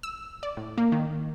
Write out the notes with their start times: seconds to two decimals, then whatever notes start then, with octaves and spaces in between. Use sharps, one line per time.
0.03 E6
0.43 D5
0.57 A2
0.78 A#3
0.92 D#3